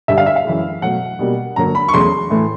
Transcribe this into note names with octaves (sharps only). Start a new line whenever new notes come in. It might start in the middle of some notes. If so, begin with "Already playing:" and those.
G2 D3 G3 E5
F5
E5
F5
F#2 C#3 E3 G#3
B2 F#3 A3 F#5
B2 G3 A#3
G2 D3 F#3 A#3 A#5
B5
C#6
E2 C#3 F#3 A3 C6
A2 E3 A3